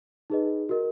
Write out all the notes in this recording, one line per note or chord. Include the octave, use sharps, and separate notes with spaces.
D#4 G#4 B4 D#5
F#4 A#4 D#5